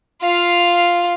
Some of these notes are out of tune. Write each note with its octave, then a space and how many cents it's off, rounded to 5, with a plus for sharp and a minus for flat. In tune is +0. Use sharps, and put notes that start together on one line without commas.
F4 +0 F5 +0